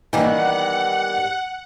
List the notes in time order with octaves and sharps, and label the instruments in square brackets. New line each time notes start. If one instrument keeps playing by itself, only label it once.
[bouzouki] D#3 G3 B3 [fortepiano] E3 A#3 [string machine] F#5